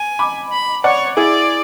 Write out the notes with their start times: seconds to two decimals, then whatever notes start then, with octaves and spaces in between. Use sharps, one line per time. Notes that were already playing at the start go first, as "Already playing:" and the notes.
Already playing: G#5
0.19 B5 D6
0.52 B5
0.84 C#5 D5 F#5
1.17 E4 G#4 D5